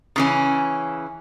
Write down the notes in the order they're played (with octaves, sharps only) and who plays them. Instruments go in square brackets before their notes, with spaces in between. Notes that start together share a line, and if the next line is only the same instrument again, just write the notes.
[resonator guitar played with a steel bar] C#3 E3 C#4